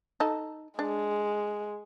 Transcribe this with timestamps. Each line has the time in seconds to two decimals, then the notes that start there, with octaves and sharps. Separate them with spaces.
0.20 D#4 A4
0.79 G#3 D4